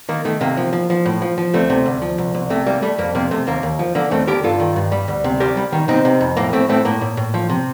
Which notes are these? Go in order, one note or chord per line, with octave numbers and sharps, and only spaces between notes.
D#3 A#3
D#3 A3
C3 A#3
F3
F3
F3
A2
F3
F3
D2 A3 C4
C3
D2
F3
C2
C2
C3 A3
G3 A#3
G3 A3
F2 A#3
C3 A#3
C3 A3
D#2 A#3
D#2
F3
D3 A#3
D#2 A3 C4
D3 G4 A#4
G2 F4 A4
D#3
G2
G3
D2
C3
G3 G4 A#4
G3
D#3
C3 C4 D#4
C3
F2
A2 A#3
A2 A3 C4
A2 A3 C4
A2 A#3
A2
A2
F3
C3